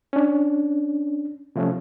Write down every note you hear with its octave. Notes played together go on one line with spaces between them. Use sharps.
C#4 D4
C3 F3 A3 C#4